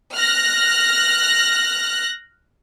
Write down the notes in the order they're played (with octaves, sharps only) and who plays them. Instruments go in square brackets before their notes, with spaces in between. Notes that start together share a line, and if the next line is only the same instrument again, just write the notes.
[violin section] F6 F#6 A#6